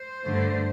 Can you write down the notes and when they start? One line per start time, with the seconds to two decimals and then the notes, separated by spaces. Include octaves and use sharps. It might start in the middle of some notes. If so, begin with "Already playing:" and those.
Already playing: C5
0.25 G2 D3 A3